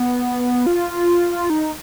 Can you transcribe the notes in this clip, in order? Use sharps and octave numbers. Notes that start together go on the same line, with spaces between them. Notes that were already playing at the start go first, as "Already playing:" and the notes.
Already playing: B3
F4
D#4